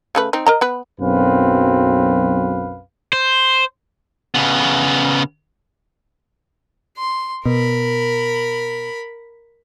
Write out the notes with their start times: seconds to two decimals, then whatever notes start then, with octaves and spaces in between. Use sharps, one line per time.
0.15 C#3 A3 B4
0.33 C4 D#4
0.47 A#4 D#5 A#5
0.61 B3 B4
1.00 B1 F#2 C4 B4 F5
3.13 C5
4.35 C#3 B3
6.98 C6
7.45 B2 A#4 B5